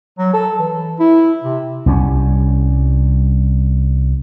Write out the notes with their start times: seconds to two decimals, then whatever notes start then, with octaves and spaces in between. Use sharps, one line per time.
0.18 F#3
0.34 A4
0.59 E3
1.00 E4
1.43 C3
1.86 C2 G3 C4 C#4